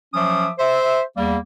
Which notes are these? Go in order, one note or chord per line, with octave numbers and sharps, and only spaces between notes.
F3 F#3 C#4 E5 D6 D#6
C5 E5
E2 G3 A#3